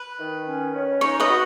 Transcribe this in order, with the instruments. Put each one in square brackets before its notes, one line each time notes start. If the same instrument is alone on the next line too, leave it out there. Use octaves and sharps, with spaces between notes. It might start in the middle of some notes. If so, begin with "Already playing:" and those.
Already playing: [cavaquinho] B4
[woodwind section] D#3
C#4
C#4
[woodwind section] D#4 [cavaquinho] C#5
[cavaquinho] B4 D#5
[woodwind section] F#4